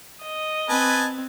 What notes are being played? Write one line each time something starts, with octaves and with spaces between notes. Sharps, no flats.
D#5
C4 B4 G#5 A5